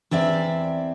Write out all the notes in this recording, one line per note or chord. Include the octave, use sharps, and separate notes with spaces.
E2 C4 D5 E5